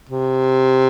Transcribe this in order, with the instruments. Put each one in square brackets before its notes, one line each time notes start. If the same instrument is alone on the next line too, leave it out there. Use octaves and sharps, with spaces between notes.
[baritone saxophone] C3